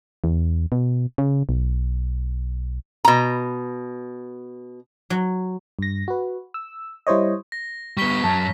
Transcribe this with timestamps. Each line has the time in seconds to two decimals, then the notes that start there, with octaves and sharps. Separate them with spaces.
0.24 E2
0.72 B2
1.18 C#3
1.49 B1
3.05 B2 A#5
5.10 F#3
5.79 G2 A#6
6.08 F#4 B4
6.54 E6
7.07 G3 E4 C5 C#5 D#5
7.52 A#6
7.97 G3 B3 C#6 B6 G7
8.24 F#2 F#3 A5